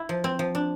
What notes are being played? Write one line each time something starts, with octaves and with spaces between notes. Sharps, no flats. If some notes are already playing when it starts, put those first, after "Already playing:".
Already playing: E4
F3
C4
F3
D4